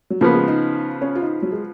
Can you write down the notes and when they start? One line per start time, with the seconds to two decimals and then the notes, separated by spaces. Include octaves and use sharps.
0.10 F#3
0.21 C#3 F3 A#3 B3
0.34 G#3
0.48 D#4
1.02 C#4
1.15 F4
1.22 D#4
1.42 F#3
1.52 G#3